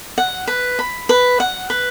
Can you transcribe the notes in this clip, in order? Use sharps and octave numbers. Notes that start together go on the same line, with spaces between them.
F#5
B4
B5
B4
F#5
B4